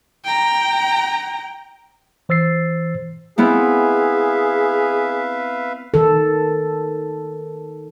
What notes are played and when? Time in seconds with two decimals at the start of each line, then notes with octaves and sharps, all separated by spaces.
0.24 G5 A#5
2.29 E3 C5 E6 A6 C7
3.38 B3 C4 E4 G#4 B4 E5 F5
5.94 D#3 A4